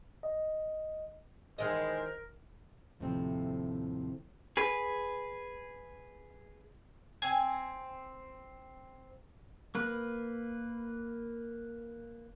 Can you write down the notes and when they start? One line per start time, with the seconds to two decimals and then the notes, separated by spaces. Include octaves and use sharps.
0.23 D#5
1.58 D#3 E3 G#3 A#4 C5 D#5
3.00 D#2 A2 C3 F3 A3 C4
4.57 G#4 B4
7.22 C4 G#5
9.75 A#3 B4